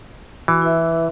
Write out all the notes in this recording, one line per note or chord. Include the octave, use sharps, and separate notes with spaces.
E3 F#4
E4 B4 E5